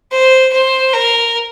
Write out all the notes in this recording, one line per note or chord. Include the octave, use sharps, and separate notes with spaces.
C5
C5
A#4